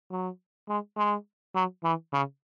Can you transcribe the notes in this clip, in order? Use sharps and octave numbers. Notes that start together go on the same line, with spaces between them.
F#3
G#3
G#3
F#3
E3
C#3